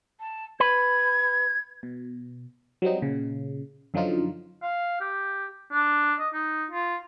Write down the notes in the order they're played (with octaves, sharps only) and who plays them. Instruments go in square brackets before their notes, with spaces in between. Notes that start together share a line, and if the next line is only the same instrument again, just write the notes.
[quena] A5
[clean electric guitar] B4 [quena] G#6
[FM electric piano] B2
F#3 G3 C4 D#4
A#2 C#3
F#2 D3 F3 F#3 D#4 F4
[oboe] F5
G4
D4
D#5
D#4
F4